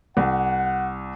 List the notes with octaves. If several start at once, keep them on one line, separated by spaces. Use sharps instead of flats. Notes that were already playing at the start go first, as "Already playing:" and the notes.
C2 F#5